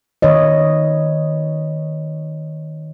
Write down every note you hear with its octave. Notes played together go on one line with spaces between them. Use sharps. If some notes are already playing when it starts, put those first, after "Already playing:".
D#3 B4 C#5 D#5